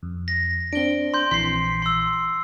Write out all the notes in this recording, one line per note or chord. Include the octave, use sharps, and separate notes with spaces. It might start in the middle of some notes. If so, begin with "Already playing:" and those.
F2
A#6
C4 D4 D7 G7
C6 G6
A#1 E3 C6 B6 C7
C6 E6